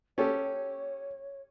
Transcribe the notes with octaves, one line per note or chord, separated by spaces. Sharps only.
C#4 G4 A4 C#5